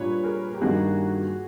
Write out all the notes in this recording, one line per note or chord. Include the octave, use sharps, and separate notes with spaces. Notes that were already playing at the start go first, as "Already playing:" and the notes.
Already playing: A#2 G3 A#3 D4 B4 C#5
G#4 A#4
G4
G2 D#3 G3 A#3 D#4 F#4 G#4